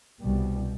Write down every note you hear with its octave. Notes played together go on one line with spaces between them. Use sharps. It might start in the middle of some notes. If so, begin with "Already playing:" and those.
C2 B2 G3